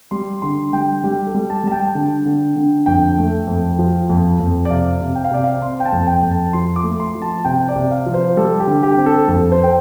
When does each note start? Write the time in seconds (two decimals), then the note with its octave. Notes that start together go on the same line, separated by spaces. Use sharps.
0.11 G3 C6
0.42 D3 C6
0.73 G3 G5
1.04 G3 G4
1.27 A4
1.35 G3
1.50 A5
1.64 G3 A5
1.72 G5
1.95 D3
2.26 D3
2.56 D3
2.86 F2 G5
3.18 A3
3.47 F2
3.79 F3
4.10 F2
4.40 F2
4.65 D5
4.70 C3 F5
5.01 C3
5.15 G5
5.24 F5
5.31 C3 D5
5.44 F5
5.62 C4 C6
5.80 G5
5.85 A5
5.93 F2
6.07 G5
6.23 F2
6.31 A5
6.53 F3 C6
6.76 D6
6.83 A3
7.00 C6
7.15 F3
7.22 A5
7.45 C3 G5
7.68 D5
7.76 C3
7.91 F5
8.06 F3
8.14 C5
8.37 G3 A4
8.60 G4
8.67 D3
8.83 G4
8.98 C4
9.06 A4
9.28 F2 A4
9.52 C5
9.64 G5